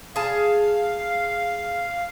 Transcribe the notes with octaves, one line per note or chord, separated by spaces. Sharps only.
G#4 F5 A5